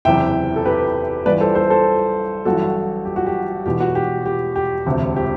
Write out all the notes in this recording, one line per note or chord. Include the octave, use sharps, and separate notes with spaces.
F#1 E2 C3 E3 E5 G5
A4
G4 B4
A1 G2 E3 B4 D5
A4 C5
A4 C5
A4 C5
A1 G2 F#3 F#4 A4
G4
F#4
G4
E1 E2 B2 G4
F#4
G4
G4
G4
E1 D2 C3
G4